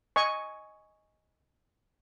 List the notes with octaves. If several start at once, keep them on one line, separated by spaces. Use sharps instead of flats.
D#5 G#5 C#6